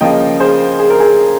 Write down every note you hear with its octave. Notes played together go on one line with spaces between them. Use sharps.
C#3 F3 A#3 D#5 G5
G#4 C5
G#4
A#4
G#4